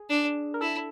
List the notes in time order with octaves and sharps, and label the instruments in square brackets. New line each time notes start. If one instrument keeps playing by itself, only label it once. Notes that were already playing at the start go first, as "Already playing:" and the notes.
Already playing: [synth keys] G#4
[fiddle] D4
[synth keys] A#4
[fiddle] E4 [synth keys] A4